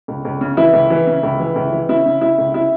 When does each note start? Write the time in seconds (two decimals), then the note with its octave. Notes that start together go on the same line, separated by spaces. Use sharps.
0.08 C#2
0.25 C#2
0.41 C#3
0.57 E3 E4
0.73 C#2
0.90 E3
1.07 C#3
1.23 C#2
1.39 E3
1.56 C#2
1.72 E3
1.89 C#3 E4
2.06 C#3
2.21 C#3 E4
2.38 C#2
2.54 C#3 E4